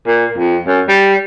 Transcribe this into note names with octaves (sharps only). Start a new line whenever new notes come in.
A#2
F2
F#2
G3